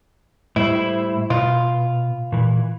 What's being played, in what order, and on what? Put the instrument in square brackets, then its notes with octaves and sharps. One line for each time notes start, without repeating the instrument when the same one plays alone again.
[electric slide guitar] A2 G3 C5 [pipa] E4
[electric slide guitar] B2 [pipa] F4
[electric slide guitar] A#2 E3